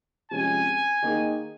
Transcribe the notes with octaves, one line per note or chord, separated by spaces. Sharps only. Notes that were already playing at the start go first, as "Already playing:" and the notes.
C3 F3 G#3 C#4 G#5
D#3 A#3 D#4 G#4